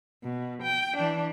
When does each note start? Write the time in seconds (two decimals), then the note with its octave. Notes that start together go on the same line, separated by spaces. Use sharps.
0.23 B2
0.63 G5
0.97 E3 D4